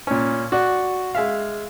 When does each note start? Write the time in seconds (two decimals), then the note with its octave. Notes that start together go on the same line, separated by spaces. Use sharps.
0.07 A#2 C#4
0.52 F#4 D5
1.15 G#3 E5 F5